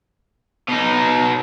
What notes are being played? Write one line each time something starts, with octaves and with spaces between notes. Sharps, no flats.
B2 D#4